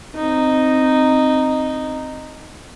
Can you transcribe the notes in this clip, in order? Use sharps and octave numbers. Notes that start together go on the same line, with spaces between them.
C4 D#4